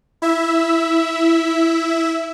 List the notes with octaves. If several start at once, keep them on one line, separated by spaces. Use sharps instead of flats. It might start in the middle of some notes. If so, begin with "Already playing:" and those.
E4 E5